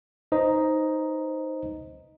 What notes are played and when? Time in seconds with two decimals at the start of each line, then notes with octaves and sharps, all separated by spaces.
0.32 D#4 B4 C5 D#5 A#5